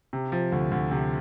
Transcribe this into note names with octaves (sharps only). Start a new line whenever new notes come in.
C3
F3
D2
D2
C3